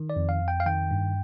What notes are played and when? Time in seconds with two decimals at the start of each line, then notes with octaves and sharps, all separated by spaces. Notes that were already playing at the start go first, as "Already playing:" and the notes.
Already playing: D#3
0.10 D5
0.16 F2
0.29 F5
0.42 F2
0.48 G5
0.60 F5
0.66 D#3 G5
0.91 G2